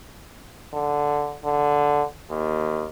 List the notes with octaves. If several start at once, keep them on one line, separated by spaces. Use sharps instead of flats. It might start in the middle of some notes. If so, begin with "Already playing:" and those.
D3
D3
D#2